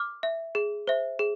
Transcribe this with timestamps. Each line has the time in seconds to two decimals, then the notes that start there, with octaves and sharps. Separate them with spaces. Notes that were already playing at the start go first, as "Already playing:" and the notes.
Already playing: D6 F6
0.23 E5
0.55 G#4
0.87 C5 E5
1.19 G#4